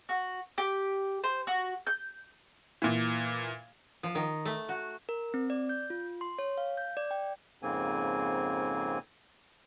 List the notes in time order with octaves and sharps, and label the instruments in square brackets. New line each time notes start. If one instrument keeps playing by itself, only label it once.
[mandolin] F#4
G4
C5
F#4
G6
[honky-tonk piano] A#2 E3
[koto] F3
D#3
A3
F#4
[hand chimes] A#4
C4
D5
G6
F4
C6
C#5
F5
G6
D5
G5
[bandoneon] F2 G#2 C#3 A#3 C4 G#5